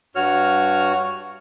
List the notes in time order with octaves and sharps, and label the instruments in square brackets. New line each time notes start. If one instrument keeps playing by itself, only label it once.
[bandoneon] G2 F#4 C#5 F6